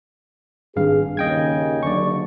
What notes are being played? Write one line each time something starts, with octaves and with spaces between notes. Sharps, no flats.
G#1 G2 G#4 F5
D#2 C#3 D#5 G5 G#6
F#1 D3 D5 C#6